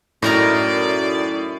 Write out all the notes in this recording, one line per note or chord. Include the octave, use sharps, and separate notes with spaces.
F#2 A2 D#4 A#4 D5 A#5